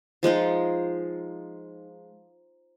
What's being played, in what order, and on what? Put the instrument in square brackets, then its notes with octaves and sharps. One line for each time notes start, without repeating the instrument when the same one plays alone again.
[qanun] F3 G#3 D#4 F4